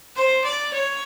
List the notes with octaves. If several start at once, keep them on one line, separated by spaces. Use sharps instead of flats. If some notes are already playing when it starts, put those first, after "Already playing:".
C5
D5
C#5